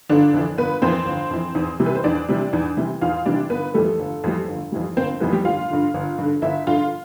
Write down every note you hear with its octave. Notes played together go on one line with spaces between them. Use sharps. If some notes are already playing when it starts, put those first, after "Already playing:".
G1 D3 D4
F2 E3
G1 B3 B4
F2 E3 C4 C5
G1
F2 E3
E2
C3 E3 G3
B4
C5
E2 D4 D5
C3 E3 G3
E2
C3 E3 G3
E2 F4 F5
C3 E3 G3 D4 D5
G1 B3 B4
F2 E3 G3 A3 A4
G1
F2 E3 G3
G1
F2 E3 G3
G1 C4 C5
F2 E3 G3 B3 B4
G3 G4
G1 F4 F5
G2 D3
G1
G2 D3
G1 E4 E5
G2 D3 F4 F5